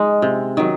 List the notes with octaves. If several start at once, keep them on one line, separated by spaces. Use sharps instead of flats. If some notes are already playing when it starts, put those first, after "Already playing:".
Already playing: G#3 D#4
C3
D#3 F#3